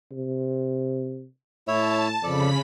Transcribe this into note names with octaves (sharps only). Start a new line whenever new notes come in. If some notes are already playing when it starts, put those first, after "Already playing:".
C3
A2 E4 C#5 E5 A5
F2 C#3 A4 D5 B5 B6